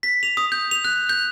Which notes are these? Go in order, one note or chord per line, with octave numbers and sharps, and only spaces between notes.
B6
F7
D#6
G6
F7
F#6
G6